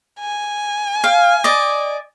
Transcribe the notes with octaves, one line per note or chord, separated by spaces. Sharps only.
G#5
F5
D5 D#5